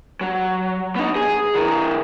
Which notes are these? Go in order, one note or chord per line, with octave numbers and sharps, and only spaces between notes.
F#3
B3 D#4
G#4
E3 A#4